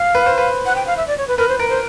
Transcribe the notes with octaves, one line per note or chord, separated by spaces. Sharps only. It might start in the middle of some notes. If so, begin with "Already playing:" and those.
Already playing: F5
B4
C5
B4
F#5
G5
F5
E5
D5
C#5
B4
A#4 B4
C5
A#4 B4
C5